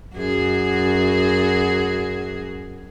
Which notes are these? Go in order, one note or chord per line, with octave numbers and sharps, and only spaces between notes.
F#2 F#4 G#4